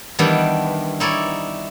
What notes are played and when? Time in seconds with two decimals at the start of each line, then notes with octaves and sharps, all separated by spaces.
0.19 D#3 E3 G3 B3 D4
1.00 D#4 E4 C#5 D5